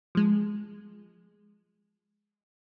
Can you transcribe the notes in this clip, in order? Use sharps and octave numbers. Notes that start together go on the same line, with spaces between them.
F3 G#3